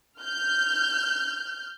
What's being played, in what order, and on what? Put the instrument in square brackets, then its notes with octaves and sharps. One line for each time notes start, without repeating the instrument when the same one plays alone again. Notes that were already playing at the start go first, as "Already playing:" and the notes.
[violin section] F6 G6